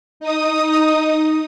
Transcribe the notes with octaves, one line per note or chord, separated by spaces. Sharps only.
D#4 D#6